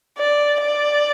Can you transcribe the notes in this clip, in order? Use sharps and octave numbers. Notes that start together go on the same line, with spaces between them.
D5
D5